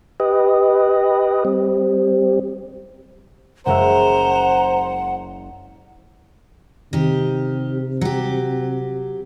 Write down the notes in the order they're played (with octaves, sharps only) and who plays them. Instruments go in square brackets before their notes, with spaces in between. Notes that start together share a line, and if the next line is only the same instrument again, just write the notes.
[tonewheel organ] G4 B4 D#5
G3 C4
[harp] F#1 G#3 E5 [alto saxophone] C5 [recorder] F#5 [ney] A#5
[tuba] C3 [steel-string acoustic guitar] D#3 G4
[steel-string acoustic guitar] F#3 G4